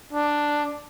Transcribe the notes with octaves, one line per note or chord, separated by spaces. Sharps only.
D4